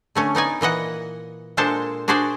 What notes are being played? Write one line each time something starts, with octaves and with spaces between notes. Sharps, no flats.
D3 A3 C#4
B3 D#4 D5 G#5
A#2 E3 D#5 F#5
A#2 G#3 D4 A4 C5 A5
D4 F#4 G#4 C5 D5